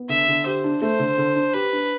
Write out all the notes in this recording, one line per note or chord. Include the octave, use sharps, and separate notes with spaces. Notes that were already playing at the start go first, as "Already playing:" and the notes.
Already playing: B3
D3 E5
D3
G4 C5
D4
A3 C5
D3
D3
D4
G4 B4
D4